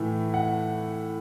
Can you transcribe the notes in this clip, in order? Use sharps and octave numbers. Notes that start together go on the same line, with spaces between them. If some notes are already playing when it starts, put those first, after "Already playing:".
Already playing: A2 E3 A3
F#5